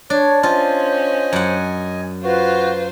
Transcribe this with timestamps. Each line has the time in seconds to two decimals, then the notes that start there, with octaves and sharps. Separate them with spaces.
0.10 D4 C#5
0.43 C#4 F4 C5 D#5 G#5
1.33 F#2 F#5
2.24 F4 F#4 B4 C5